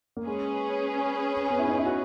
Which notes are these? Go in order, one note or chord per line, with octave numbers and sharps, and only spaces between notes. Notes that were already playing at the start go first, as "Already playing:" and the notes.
A#3
G#3 C#4 G#4 B4
B3
E4
D#4
E4
F#4